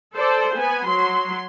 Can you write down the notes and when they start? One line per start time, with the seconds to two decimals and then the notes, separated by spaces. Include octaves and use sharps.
0.14 A4 C5 D5
0.55 B3 G#5
0.88 F#3 C6